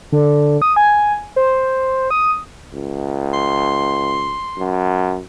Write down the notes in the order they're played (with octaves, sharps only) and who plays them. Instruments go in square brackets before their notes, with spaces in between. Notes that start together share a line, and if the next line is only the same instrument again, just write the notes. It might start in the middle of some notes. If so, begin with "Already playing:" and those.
[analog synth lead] D3
D#6
G#5
C5
D#6
[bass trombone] C#2
[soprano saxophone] C6
[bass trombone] F#2